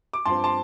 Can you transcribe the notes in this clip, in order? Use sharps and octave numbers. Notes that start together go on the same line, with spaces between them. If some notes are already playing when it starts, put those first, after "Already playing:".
D6
G2 F3 C4 A5 C6
A5 C6